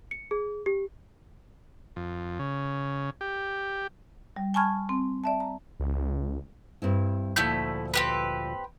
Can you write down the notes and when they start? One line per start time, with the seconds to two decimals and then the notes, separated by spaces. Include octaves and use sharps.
0.11 C#7
0.31 G#4
0.66 G4
1.96 F2
2.39 C#3
3.21 G4
4.36 G3
4.54 G#5 A5 B5 C#6 F6 G#6
4.89 C4
5.24 D5 E5 A5
5.40 A#5
5.80 C#2
6.82 G2 C4 E4
7.36 D2 A#2 F3 A3 E4 G6
7.94 C4 G4 B4